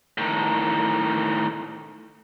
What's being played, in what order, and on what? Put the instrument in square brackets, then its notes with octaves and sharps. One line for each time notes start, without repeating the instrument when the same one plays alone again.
[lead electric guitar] A2 D#3